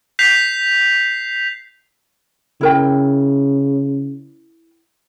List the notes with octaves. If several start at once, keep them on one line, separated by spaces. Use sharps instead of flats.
G6 B6 C7 F7
C#3 E4 A#4 G5